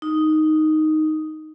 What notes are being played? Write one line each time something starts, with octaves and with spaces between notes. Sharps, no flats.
D#4